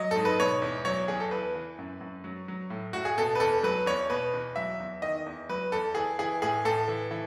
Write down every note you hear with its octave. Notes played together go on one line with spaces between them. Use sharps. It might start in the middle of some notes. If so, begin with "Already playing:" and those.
Already playing: F#3 D#5
G#2 A4
B4
B2 C#5
E2
F#3 C#5
E2 G#4
A4
E3 B4
E3
F#2
F#2
F#3
F#3
A2
A2 F#4
G#4
B2 A4
B4
E2 A4
F#3 B4
E2 C#5
B2 B4
E2
F#3 E5
E2
D#3 D#5
E2
F#3 B4
E2 A4
E3 G#4
E3 G#4
A2 G#4
A2 A4
E3
E3